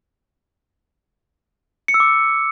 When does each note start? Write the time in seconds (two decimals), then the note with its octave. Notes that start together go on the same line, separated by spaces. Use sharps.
1.88 C#7
1.94 E6
2.00 D6